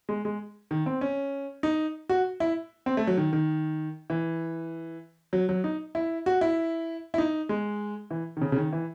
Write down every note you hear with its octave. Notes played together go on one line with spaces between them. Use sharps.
G#3
G#3
D#3
C4
C#4
D#4
F#4
E4
C4
A3
F#3
D#3
D#3
E3
F#3
F#3
D#4
E4
F#4
E4
E4
D#4
G#3
E3
D#3
C#3
C#3
D#3
E3